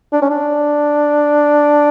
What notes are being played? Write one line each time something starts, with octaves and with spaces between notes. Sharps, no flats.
D4
C#4
D4